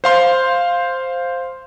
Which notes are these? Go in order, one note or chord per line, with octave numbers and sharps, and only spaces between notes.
C5 F5 C6